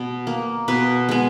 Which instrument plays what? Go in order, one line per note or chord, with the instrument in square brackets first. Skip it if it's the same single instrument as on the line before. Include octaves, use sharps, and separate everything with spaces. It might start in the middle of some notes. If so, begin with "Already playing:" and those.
Already playing: [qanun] B2
A#3
B2 B4
G#3 B3